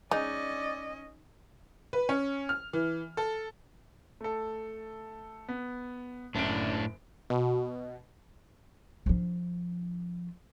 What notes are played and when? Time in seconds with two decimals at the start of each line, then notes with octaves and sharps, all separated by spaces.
0.11 G#3 C#4 D#4 D5 D#5
1.93 B4
2.09 C#4
2.49 F6
2.73 E3
3.17 A4
4.21 A3 A4
5.48 B3
6.35 F#1 F#2 A2 D4 D7
7.30 B2
9.06 F3 D4